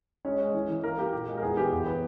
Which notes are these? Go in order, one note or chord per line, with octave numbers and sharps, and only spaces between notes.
G#3 C#4 C#5
G#3
E3
E3
A#3 A#4
A#3 G4
A#2 G4
G#3
A#4
E2 G#4
B3 G4
E2
B3